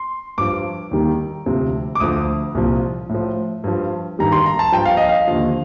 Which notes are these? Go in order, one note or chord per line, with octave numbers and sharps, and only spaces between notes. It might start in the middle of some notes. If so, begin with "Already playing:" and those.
Already playing: C6
G2 F3 D6
D#2 D#3 G3
D2 C3 F3
D6
D2 D3 F3 D#6
C2 A#2 F3
A2
F3
G2 F3
G2 D#3 G3 A#5
C6
A#5
A5
G2 F3 G5
F5
D#5
F5
D#2 D3 F3